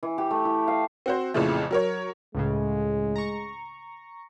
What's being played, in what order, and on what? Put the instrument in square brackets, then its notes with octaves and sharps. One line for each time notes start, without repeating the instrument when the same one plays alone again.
[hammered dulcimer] E3
G4
A3
E4
F5
[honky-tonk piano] C4 F#4 C5
A1 F2 A#2 C#3 E3 A3
F#3 A#4 C#5
[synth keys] C#2 A2 C#3 [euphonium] G#3
[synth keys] A#5 C#6